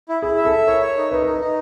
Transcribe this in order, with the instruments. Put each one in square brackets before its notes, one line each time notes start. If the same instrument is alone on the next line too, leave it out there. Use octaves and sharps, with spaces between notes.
[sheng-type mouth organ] E4
[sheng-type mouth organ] E4 [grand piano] G#4
[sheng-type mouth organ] E5
[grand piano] A4
[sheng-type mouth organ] E5
[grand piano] A#4 [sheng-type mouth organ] C#5
[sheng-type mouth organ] C#5
D#4
[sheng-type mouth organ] D#4 [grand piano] B4
[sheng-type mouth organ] D#4 [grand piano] A#4
[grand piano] B4
[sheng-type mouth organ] D#4